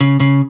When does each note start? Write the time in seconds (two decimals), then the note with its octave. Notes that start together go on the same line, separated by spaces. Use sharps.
0.01 C#3
0.20 C#3